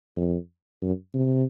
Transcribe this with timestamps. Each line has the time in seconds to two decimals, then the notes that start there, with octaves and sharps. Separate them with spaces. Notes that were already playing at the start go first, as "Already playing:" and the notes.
0.17 F2
0.82 F#2
1.14 C3